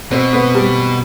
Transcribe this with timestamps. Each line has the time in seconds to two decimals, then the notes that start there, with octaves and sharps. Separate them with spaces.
0.11 B2 C4
0.33 B3
0.54 G3